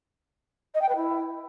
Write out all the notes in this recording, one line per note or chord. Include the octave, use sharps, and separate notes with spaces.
D#5
G5
B4
E4